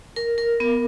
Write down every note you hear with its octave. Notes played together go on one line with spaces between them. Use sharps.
A#4
A#4
B3